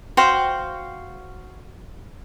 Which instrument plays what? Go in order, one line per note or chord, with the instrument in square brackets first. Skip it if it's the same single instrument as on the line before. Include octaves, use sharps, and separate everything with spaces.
[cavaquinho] F#4 C5 F5 G5